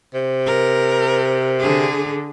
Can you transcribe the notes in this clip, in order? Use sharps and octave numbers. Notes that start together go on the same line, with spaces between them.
C3
A#4
D3 G#4